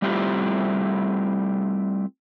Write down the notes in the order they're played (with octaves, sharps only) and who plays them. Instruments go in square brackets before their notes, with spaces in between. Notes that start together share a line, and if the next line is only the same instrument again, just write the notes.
[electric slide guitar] G3 A3 C4 E4 F4 G4